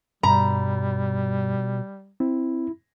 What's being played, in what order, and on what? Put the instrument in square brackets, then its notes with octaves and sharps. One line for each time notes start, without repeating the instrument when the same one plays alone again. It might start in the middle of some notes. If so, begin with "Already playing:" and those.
[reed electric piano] G2 B5 [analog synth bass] B2 [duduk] G3 [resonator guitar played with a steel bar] A#5
[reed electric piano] C4 [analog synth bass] E4